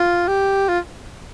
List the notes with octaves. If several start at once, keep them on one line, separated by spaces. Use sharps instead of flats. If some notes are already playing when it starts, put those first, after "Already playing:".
Already playing: F4
G4
F4